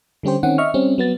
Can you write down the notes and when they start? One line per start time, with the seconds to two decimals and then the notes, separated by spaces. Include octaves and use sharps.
0.23 D3 G3 C#4 G4 C5
0.43 D#3 C4 C#4 F#5
0.58 D#5 E5 C#6 F6
0.74 G3 C4 C#4
0.98 F#3 B3 A6